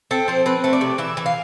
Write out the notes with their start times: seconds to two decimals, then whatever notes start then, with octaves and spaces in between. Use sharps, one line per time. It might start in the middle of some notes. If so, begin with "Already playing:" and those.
0.11 C4 A4
0.28 F3 C5
0.46 C4 B4
0.64 A3
0.73 D5
0.81 C3
0.98 E3 E5
1.17 E3
1.26 F5